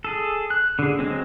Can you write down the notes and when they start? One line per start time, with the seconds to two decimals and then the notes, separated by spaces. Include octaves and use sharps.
0.05 G#4 A4
0.50 F#6
0.79 D3 G#4
0.99 F#3 G#3 C4